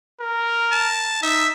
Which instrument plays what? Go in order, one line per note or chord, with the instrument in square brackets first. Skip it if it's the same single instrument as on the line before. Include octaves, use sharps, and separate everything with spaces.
[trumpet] A#4
[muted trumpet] A5
[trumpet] D#4 [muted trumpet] E5